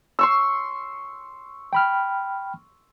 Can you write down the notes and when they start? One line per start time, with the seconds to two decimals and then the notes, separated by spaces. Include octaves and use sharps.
0.19 C6 C#6 E6
1.73 G5 B5 F6